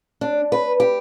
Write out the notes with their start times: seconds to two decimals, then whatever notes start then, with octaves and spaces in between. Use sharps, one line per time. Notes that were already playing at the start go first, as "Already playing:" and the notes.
0.21 D4
0.52 B4
0.80 G4